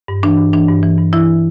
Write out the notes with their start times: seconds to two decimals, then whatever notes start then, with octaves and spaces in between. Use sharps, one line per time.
0.08 G2
0.23 E3 D4
0.38 G2
0.53 E3 D4
0.68 G2
0.83 E3
0.98 G2
1.13 E3 E4